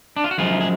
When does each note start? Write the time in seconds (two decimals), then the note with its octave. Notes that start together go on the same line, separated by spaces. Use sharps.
0.17 D4
0.24 F4
0.31 F#4
0.38 F#2 F3 G#3 F4 G#4
0.61 G#4